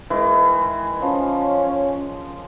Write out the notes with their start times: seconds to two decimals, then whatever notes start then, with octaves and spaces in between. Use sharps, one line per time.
0.10 D#3 E3 G#3
1.02 F3 C#4